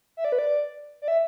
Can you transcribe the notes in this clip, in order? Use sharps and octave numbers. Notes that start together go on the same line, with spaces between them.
E5
D5
B4
D5
D5
E5